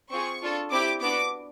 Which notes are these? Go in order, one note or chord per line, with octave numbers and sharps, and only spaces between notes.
C4 F4 G#4 C#6
D4 F4 A4
C4 E4 G4 D6
B3 D4 F#4 D6